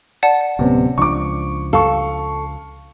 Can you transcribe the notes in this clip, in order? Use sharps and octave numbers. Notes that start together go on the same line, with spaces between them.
D5 F#5 A5
D1 C3 B3 C#4
C#2 F3 D4 C#6 D6
A4 F5 C#6